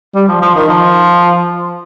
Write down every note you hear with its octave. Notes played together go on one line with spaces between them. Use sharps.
G3
F3
F3
D#3
F3